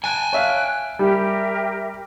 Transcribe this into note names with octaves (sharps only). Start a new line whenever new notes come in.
G5 G#5 F#6
C#5 E5 F5
G3 G4 A#4 E5